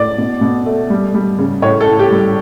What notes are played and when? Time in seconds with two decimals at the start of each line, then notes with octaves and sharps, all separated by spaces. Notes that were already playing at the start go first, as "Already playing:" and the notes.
Already playing: A2 D5
0.18 B2
0.41 B2
0.66 A3
0.90 G3
1.14 G3
1.38 C#3
1.62 A2 C#5
1.80 A4
1.87 A2
1.99 G4
2.12 G3